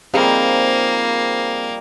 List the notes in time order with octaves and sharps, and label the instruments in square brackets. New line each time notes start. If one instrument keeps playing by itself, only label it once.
[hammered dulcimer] F3 G3 D#4 [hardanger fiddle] A#3 [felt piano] C4 G#4 F5